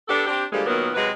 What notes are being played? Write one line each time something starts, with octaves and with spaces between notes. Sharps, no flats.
B3 D4 G4 A4
C4 D4 G4
D3 F3 G3 G#3 A#3
A#2 D#3 F#3 A#3 B3
C3 F#3 G#3 B4